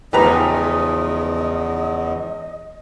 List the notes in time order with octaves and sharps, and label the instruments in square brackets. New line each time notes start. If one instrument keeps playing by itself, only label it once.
[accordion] E2 [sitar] G#2 C#3 F3 [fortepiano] G4 B4 A#5 [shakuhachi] D#5